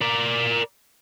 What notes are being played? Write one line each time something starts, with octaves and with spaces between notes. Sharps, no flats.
A#4 D5